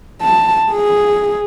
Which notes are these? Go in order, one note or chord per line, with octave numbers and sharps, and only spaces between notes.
A5
G#4